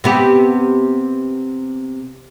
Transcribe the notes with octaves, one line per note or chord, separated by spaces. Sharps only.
C3 B3 G4